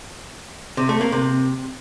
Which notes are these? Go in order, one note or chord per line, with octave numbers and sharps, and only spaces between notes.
C3
A3
A#3
C3